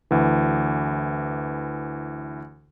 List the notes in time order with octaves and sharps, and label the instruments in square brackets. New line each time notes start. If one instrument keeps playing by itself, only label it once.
[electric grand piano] D2 E3